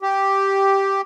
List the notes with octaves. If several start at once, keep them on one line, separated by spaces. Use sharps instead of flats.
G4